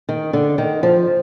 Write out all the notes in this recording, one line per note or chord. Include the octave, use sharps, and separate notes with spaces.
D#3
D3
D#3
F3